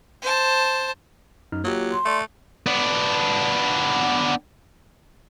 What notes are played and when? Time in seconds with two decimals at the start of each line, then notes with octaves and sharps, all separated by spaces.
0.22 C5 A5
1.52 F#2 D#4 F6
1.64 F#3 A#3 F4 G4
1.92 C6
2.05 A3 D5 E5
2.66 B3 D4